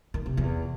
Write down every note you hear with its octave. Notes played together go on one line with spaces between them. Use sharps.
D#3
C3
E2